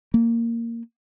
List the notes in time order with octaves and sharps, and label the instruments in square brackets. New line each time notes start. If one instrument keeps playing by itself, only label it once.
[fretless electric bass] A#3